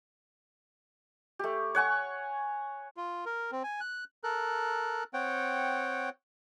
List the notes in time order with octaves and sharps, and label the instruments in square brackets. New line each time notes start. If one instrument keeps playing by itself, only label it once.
[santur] A3 G4
C#5 F#5 G#5 C#6
[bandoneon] F4
A#4
C4
G#5
F#6
A4 A#4 F#6
C4 C#5 F#5 G5